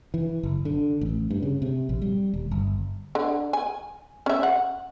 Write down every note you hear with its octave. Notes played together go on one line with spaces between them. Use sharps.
E3
F#1
D3
A1
G2
C#3
C3
A#1
G3
D#1
G1
D3
G#5
C#4 E5
F#5